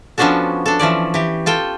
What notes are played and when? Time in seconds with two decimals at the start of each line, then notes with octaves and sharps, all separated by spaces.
0.18 F3 B3 C#4 D4 F#4 A4
0.66 D4 A4
0.79 E3 F3 C#4 D5
1.14 E3 G4
1.46 F4 A4 G5